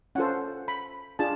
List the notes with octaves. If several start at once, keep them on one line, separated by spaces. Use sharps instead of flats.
C#4 F4 A4 C5 F#5
B5
D4 F4 G#4 A5